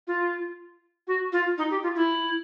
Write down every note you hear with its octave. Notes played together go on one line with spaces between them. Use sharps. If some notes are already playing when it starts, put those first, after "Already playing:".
F4
F#4
F4
D#4
G4
F4
E4